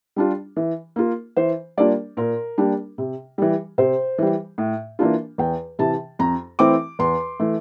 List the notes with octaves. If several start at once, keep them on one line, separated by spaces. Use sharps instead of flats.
G3 D4 F4
E3
A#3 F4
E3 C5
G3 A#3 D4 F4 D5
A#2 A#4
G3 A#3 D4
C3
E3 G3
C3 C5
E3 G3
A2
E3 A#3 D4 F4
E2 G5
C3 E3 A5
F2 A#5
E3 A3 C4 E4 D6
E2 C6
E3 A3